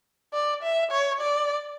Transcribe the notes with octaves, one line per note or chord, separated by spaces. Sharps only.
D5
E5
C#5
D5